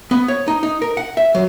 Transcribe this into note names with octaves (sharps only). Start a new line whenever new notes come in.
B3
C#5
D#4
D#4
A#4
F#5
E5
F#3